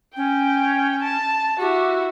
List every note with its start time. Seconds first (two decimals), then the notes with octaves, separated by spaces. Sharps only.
0.16 C#4 G5
1.02 A5
1.59 E4 F#4 G4